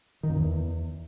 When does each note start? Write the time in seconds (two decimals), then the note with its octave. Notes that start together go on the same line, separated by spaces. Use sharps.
0.23 D#3
0.30 F2
0.36 E2